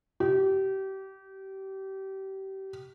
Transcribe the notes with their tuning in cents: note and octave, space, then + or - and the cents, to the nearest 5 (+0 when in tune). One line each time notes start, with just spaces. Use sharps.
G4 -30